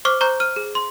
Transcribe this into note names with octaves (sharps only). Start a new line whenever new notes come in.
C5 C#6 D6 F6
C5 A#5 C#6 G6
F6 D#7
G#4
C6